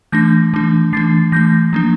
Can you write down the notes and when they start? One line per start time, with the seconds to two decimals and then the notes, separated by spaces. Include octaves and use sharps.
0.12 E3 A3 D4 G6 A#6
0.54 E3 A3 D4
0.93 E3 A3 D4 A6 C7
1.32 E3 A3 D4 G6 A#6
1.73 F3 A#3 D4